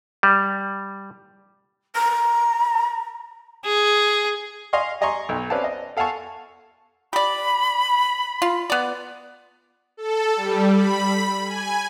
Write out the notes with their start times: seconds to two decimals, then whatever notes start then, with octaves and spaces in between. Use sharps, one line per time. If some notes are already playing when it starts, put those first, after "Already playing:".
0.23 G3
1.95 A#5
3.65 G#4
4.73 D#5 F5 G#5 C6 C#6
5.01 D5 D#5 G#5 A#5 C6 C#6
5.29 B1
5.50 C4 C#4 B4 D5 F5 A5
5.64 D#5
5.97 A4 F5 F#5 G#5 A5 C#6
7.13 G4 D5 B5
8.42 F4
8.70 B3 D5
9.97 A4
10.36 G3
10.74 B5
11.46 G#5